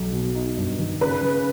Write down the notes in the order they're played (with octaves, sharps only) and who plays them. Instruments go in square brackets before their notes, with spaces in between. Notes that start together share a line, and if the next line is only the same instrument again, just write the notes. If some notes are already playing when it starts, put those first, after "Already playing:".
Already playing: [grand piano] B1
B2
D#4
G2
D#3
[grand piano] C#3 [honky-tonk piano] B4
[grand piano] C#3